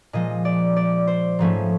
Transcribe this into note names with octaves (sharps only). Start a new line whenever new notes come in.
A#2 F3 G#3 D#5
D5
D5
C5
G#2 F3 A3 C#4